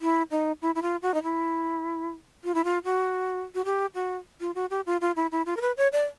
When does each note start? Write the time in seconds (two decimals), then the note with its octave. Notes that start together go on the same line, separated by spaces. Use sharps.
0.01 E4
0.31 D#4
0.62 E4
0.75 E4
0.82 F4
1.02 F#4
1.14 D#4
1.23 E4
2.44 F4
2.54 E4
2.64 F4
2.84 F#4
3.55 F#4
3.65 G4
3.95 F#4
4.40 F4
4.55 F#4
4.70 G4
4.86 F4
5.01 F4
5.16 E4
5.32 E4
5.46 F4
5.57 A#4
5.61 B4
5.77 C#5
5.92 D5